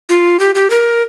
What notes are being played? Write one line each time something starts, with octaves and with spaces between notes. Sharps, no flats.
F4
G4
G4
A#4